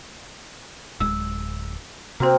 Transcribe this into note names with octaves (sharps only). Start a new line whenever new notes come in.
D1 G#3 E6
C3 A#3 C4 F#4 C5